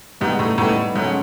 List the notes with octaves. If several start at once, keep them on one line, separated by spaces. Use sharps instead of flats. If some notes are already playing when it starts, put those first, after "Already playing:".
G#2 G3 B3 D#4 G4
A2
A2 G3 B3 D#4 G4
G#2 F#3 A3 C#4